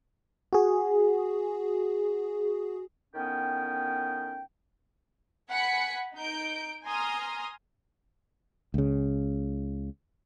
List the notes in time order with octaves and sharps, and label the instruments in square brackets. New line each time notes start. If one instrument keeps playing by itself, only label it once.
[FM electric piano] F#4 G#4
[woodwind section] A2 D#3 B3 C#4 G5
[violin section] F#5 G#5 B5 B6 C#7
D#4 G6 D7
G#5 A#5 C6 D#6 F6
[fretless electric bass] C#2 C#3